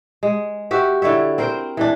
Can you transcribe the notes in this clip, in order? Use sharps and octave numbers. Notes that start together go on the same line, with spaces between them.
G#3
F#4 G4 E5
D3 E4 C#5 E5
C4 A#4 C5
E3 D4